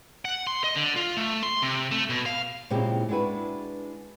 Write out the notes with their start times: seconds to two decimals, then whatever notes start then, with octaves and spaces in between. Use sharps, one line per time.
0.25 F#5
0.47 C6
0.64 D#5
0.76 D3
0.96 F4
1.17 A3
1.43 C6
1.62 C3
1.91 A3
2.10 B2
2.26 F5
2.70 A#2 C#3 G#3 C4 E4 G4
3.09 G#3 D4 E4 F#4 B4